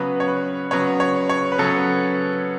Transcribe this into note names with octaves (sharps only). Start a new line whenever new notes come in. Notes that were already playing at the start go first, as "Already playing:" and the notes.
Already playing: C#3 F#3 B3 B4
C#5
B4
C#3 F#3 B3 C#5
C#5
C#5
B4
C#3 F#3 B3 A4